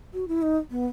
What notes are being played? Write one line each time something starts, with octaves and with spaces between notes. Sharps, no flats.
F#4
E4
D#4
B3